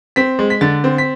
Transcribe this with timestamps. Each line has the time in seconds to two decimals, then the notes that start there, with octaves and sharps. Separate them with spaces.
0.16 C4 B6
0.39 G#3
0.50 B6
0.61 D3 A6
0.84 C4
0.98 B6